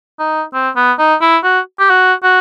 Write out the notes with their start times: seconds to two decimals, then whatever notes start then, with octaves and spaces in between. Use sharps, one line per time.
0.20 D#4
0.54 C4
0.76 B3
0.99 D#4
1.21 E4
1.44 F#4
1.80 G4
1.90 F#4
2.23 F#4